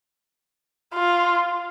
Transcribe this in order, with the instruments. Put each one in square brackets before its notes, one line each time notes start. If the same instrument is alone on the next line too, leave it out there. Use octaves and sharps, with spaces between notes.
[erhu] F4